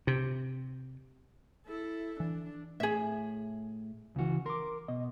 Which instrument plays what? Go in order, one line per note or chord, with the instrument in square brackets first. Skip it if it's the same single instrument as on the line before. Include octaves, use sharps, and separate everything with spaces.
[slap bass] C3
[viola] E4 A4
[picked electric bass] E3 [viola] D4
[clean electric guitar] A2 [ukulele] G#4 E5
[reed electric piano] C#2 E3 [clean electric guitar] C#3 F#4
[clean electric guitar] A#4 [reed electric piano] C6 D6
[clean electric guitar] B2 [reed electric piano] D#5